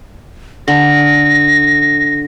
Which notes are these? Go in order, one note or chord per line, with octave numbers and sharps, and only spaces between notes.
D3 A#6